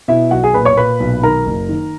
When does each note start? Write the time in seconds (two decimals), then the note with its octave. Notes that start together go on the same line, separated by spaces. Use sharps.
0.08 B2 E4 E5
0.31 B1 F#4 F#5
0.44 G#4 G#5
0.54 A#2 B4 B5
0.65 C#5 C#6
0.77 A#2 B4 B5
1.00 B1
1.23 D#3 A#4 A#5
1.47 F#1
1.69 D#3